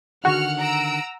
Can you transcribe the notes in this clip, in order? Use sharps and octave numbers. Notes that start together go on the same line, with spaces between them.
D3 D#3 F#4 G#4 F#5 F6 C#7
A#5 E6 D7